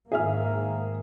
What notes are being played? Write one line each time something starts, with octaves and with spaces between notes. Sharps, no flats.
G#2 D#3 A#3 G#4 E5 F6